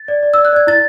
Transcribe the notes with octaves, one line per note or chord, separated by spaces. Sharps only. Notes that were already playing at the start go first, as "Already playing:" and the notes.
Already playing: A6
D5
D5
D5 E6
F#6
D5 G#6
E4 A6